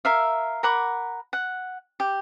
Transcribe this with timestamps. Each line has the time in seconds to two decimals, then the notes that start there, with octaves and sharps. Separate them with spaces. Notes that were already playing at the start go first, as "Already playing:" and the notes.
0.05 A#4 E5 F5
0.63 A#4 F#5 B5 D6
1.33 F#5
2.00 G4